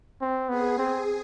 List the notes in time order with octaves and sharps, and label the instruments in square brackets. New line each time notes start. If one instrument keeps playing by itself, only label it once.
[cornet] C4
[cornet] B3 [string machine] G#4
[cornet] C4